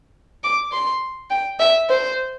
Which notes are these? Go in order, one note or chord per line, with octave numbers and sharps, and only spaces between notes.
D6
C6
G5
E5
C5